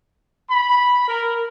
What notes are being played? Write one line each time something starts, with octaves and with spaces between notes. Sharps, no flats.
B5
A#4